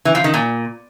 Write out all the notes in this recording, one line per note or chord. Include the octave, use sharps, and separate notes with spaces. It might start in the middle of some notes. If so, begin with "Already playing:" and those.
E3
F3
D#3
A#2